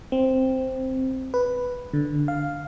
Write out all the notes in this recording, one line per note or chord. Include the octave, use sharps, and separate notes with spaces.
C4
B4
D3
F5